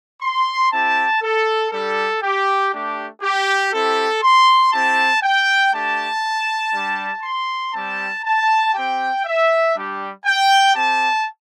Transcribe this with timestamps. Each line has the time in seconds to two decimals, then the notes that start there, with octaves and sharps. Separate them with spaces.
0.22 C6
0.71 C4 E4 G4 A5
1.22 A4
1.72 G3 D4 G4 A4
2.22 G4
2.73 A3 D4 G4
3.22 G4
3.72 C4 E4 G4 A4
4.23 C6
4.73 C4 E4 G4 A5
5.22 G5
5.73 A3 D4 G4 A5
6.73 G3 D4 G4
7.23 C6
7.74 G3 C4 G4 A5
8.24 A5
8.74 C4 G4 G5
9.25 E5
9.75 G3 D4 G4
10.25 G5
10.74 C4 G4 A5